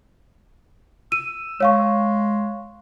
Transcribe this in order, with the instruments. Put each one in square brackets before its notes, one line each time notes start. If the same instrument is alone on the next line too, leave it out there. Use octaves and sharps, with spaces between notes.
[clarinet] E6 [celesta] D#7
[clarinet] G#3 [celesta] C#5 F5 C#6